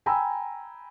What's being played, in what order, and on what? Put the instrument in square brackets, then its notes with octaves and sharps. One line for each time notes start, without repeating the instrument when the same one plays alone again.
[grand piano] G5 G#5 A#5 B5 E6